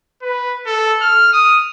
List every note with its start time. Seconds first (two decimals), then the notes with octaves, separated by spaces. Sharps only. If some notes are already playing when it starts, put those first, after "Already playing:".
0.22 B4
0.66 A4
1.01 F6
1.33 D#6